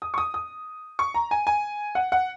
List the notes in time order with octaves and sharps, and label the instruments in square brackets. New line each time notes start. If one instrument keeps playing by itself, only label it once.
[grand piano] D#6
C#6
D#6
D#6
C#6
A#5
G#5
G#5
F#5
F#5